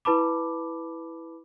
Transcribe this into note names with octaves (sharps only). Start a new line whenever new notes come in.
E4 B4 A5 B5 D6